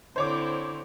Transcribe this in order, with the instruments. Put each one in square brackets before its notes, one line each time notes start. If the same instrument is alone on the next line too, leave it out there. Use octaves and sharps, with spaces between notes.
[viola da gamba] D3 C4 E4 [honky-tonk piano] C5 C#5 D6